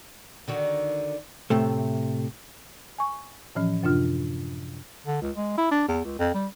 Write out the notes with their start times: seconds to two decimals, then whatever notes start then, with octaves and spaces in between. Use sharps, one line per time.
0.48 D3 D#3 F#4
1.50 A2 C3 A3
2.98 G#5 C#6
3.55 A2 E3 F3 C#4
3.83 F#2 C3 D4 F4 F6
5.07 D3
5.22 C#2
5.37 G#3
5.58 E4
5.72 D4
5.88 E2
6.04 C#2
6.19 F2
6.34 G3